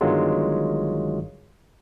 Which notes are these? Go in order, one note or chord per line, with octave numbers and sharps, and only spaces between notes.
G1 G2 D#3 F#3 G#3 F4